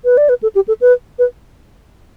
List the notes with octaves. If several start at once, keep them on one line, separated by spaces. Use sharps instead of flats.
B4
D5
B4
A4
G4
A4
B4
B4